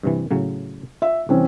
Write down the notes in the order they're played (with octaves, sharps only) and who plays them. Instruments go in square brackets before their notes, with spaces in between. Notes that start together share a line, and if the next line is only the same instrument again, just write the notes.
[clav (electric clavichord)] G2 C3 E3
A2 C#3 F#3
[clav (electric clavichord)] F4 [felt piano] E5
[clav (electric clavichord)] C2 [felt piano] E3 C4 C#4